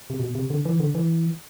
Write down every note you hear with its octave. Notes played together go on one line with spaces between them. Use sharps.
C3
B2
C3
D3
E3
D3
E3